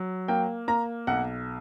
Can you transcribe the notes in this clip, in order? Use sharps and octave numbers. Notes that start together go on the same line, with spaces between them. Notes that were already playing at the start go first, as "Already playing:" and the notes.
Already playing: F#3
A#3 G5
A#3 A#5
B1 F#5